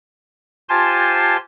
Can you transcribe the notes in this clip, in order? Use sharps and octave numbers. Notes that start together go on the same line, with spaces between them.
F4 G4 C5 G#5 A5 C6